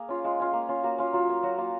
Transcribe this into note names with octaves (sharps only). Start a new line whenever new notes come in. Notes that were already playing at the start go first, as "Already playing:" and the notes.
Already playing: A#3 G#4
C#4 F4
G#3 F4
C#4 F4
A#3
C#4 F4
A#3 F#4
C#4 F4
F#3 F4
A#3 F4
F#3 F#4
A#3 F4